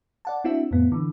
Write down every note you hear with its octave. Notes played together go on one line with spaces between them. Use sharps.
D5 F#5 A5
C4 D4 E4 F#4 E5
F2 A2 B3
D3 E3